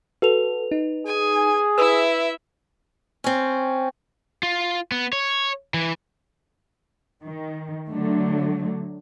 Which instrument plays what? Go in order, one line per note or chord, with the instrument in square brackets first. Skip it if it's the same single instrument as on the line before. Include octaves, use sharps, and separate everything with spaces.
[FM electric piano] F#4 A4 [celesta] B4 F7
[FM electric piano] D#4
[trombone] G#4 [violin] G#5
[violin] E4 E5 [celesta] B4 [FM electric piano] E6
[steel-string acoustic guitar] C4 C#4
[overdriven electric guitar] F4
B3
C#5
E3
[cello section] D#3
D3 F#3 A3